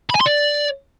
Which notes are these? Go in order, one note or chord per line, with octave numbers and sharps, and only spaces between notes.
B5
G#5
C6
D5